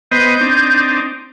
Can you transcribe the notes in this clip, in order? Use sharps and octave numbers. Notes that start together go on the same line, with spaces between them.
B3 C5 D#5 G6
C4 D4 D#4